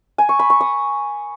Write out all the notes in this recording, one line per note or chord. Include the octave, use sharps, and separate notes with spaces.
G#5
C#6
B5
C#6
D#6